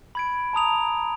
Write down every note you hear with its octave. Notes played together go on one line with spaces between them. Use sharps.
B5 G#6 D7
A5 A#5 D#6 F7